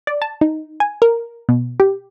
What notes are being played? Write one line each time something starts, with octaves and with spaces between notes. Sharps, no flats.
D5
A5
D#4
G#5
A#4
B2
G4